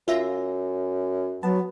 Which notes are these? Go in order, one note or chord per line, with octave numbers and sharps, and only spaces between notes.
F#2 F4 E5 A#6
F#3 B3 A5